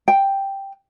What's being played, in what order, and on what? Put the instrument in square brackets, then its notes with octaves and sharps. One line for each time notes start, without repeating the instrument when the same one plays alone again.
[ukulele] G5